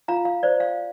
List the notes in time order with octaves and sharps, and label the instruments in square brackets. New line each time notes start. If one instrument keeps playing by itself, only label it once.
[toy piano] F4 F5 A#5
F5
C5 D5
F5